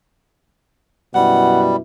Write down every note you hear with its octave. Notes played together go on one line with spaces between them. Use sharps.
F#2 B2 G3 E4 F#5